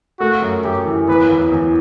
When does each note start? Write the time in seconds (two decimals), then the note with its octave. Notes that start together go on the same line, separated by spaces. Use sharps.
0.20 A3 F#4
0.42 F#2
0.64 F#2 G4
0.85 E3
1.08 E2 B4
1.29 E2
1.52 E2